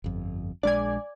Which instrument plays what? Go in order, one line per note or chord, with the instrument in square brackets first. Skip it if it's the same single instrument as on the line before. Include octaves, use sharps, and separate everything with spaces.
[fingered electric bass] G1 F2
[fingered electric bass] A#1 G#3 D4 [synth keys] D5 G#5